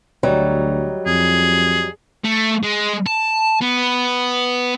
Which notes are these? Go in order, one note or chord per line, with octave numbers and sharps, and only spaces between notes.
D2 F#3 G3 D#4
F2 G#4
A3
G#3
A5
B3